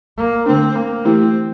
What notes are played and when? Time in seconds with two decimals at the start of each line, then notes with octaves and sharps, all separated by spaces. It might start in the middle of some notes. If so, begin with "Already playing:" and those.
0.17 A#3
0.46 D3 A3 C4 D4
0.76 A#3
1.05 E3 A3 C4 E4 G4